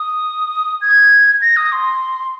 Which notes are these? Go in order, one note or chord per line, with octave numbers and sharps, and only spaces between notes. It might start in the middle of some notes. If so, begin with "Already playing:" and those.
Already playing: D#6
G#6
A#6
D#6
C6